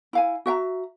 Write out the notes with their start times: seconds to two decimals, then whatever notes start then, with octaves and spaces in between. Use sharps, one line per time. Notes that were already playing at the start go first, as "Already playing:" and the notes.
0.13 E4 F5 G#5
0.46 F#4 E5 G5 A#5